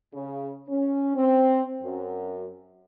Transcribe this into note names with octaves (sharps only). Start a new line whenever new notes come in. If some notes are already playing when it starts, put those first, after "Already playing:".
C#3
C#4
C4
F#2